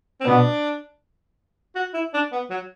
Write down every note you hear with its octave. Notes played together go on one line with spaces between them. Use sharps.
C4
B2 B3 D4
F#4
E4
D4
B3
F#3